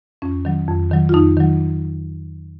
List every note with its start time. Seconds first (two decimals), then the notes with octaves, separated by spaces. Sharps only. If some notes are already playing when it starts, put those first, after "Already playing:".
0.22 F2 C#4
0.45 D#3 F#3
0.68 F2
0.91 D#3 F#3
1.09 F4
1.14 F2 D#4
1.37 D#3 F#3